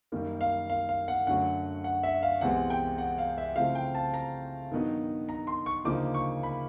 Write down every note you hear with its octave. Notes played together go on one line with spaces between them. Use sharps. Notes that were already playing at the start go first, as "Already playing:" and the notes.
F#2 D#3 G3 A#3
F5
F5
F5
F#5
F#2 D3 F#3 A3 C#4 F#5
F#5
E5
F5
C2 C3 E3 G#3 B3 F#5
G5
F#5
F5
E5
C#3 F3 A3 C4 E4 F5
G5
A5
A#5
G2 D#3 F#3 B3 D#4
A#5
C6
C#6
D2 C#3 F3 A#3 D#4 D6
C#6
B5